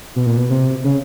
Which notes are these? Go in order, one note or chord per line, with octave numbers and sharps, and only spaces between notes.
B2
A#2
B2
C3
C#3